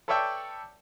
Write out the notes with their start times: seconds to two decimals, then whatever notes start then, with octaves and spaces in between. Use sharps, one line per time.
0.08 A4 B4 C#5 D5 E5 G5